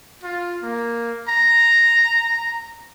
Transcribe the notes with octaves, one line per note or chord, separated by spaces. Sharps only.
F4
A#3
A#5